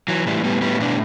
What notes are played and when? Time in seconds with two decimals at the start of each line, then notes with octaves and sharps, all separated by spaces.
0.08 E3 F#3
0.26 A2 E3 G3
0.44 A2 G3 B3
0.62 A2 G3 B3
0.81 B2 B3 D4